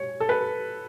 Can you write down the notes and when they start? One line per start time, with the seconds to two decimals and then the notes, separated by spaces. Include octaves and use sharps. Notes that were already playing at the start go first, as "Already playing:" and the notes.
Already playing: C#5
0.20 A4
0.29 B4